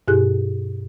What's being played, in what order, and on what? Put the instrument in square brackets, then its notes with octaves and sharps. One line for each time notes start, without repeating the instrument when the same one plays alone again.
[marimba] G2 B2 E4 G4 G#4 F#6